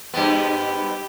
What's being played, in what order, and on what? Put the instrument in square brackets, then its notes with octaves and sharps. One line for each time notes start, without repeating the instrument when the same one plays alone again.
[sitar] G2 B3 [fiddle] G4